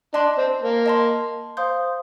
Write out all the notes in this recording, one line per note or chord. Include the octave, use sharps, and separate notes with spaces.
D4 D#5 A5 C6
C4
A#3
D#5 A5 C6
C5 F5 C6 D#6 G6